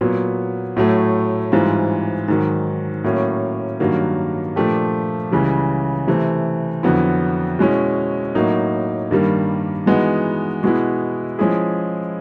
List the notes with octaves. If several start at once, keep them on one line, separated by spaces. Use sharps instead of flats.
A#2 F#3 B3
A2 F#3 A3
G#2 E3 G3 C4 F4
G#2 D#3 F#3
A2 F#3 A#3 C#4
G2 D#3 F#3 A#3
A#2 F3 A3 D4 G4
C#2 C#3 E3 G3
C3 E3 A3 C4
F2 D3 F#3 B3 E4
B2 G#3 C#4 E4
A2 F#3 A#3 D#4 F#4
G2 D#3 G3 A#3
E3 G#3 B3 D#4 F#4
B2 G#3 B3 E4
F3 G#3 C#4 E4 G#4